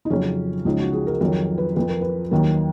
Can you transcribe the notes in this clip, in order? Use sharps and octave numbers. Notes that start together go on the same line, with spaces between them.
D#4
F2 C#3 F#3 C#4
C#2 C#3 F3 D#4
F#4
G#4
A#4
F2 D#3 F#3 A#4
B4
F2 F3 B4
A#4
B4
D#2 D#3 F#3 A#4